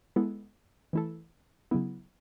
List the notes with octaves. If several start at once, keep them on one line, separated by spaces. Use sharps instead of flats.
G#3 B3 E4 A4
E3 A3 E4 A4
C#3 F#3 B3 E4